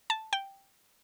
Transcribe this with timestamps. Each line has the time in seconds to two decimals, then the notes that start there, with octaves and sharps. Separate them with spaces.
0.10 A5
0.33 G5